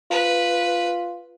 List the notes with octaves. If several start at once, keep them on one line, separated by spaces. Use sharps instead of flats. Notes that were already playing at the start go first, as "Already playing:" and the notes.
F4 B4